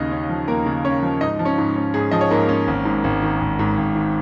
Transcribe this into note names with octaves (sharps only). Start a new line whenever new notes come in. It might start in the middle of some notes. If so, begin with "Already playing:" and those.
Already playing: D#2 C#3 D#4 D#5
C#4
F3
D#2 A#3 A#4
C#3
C#4 C#5
F3
G#2 D#4 D#5
F3
C#4 C#5
G#2
C#4
G#2 G#4
F3 D#5
C#5
G#2 A#3 A#4
C#4
G#1
G#2
G#1
D#3
G#1
G#2
G#1
D#3